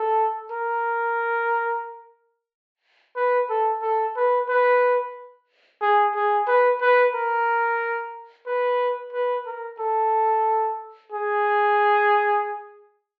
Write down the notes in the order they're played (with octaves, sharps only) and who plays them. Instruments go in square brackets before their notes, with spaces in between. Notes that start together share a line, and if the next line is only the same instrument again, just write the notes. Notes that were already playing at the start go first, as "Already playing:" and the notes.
Already playing: [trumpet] A4
A#4
B4
A4
A4
B4
B4
G#4
G#4
B4
B4
A#4
B4
B4
A#4
A4
G#4